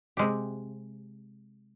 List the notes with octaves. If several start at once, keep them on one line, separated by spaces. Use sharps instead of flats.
C3 G#3 G4